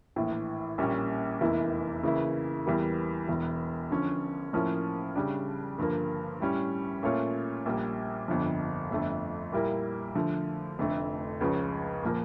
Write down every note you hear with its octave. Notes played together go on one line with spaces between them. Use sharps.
A#1 A2 E3
A#1 A#2 G3 C#4
F1 E2 E3 A#3 E4
C#3 E3 A#3 E4
E2 E3 G3 A#3
E1 E2 E3
D3 F3 C#4
A2 F3 A#3 C#4
C#3 G3 D4
G2 D3 F3 A#3
A2 G3 C#4
A#2 A3 C#4 F4 C#5
A#1 A#2 G3 A#3
G1 F2 D3 F3
G1 F2 D3 A3
A#2 G3 A#3 E4
D3 F3 A3
F1 F2 D3 A3
C#2 C#3 F3 C#4
A#2 F3 A#3